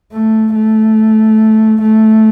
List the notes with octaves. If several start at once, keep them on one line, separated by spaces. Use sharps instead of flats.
A3
A3
A3